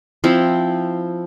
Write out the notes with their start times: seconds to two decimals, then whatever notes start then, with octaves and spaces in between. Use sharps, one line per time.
0.24 F3 C4 E4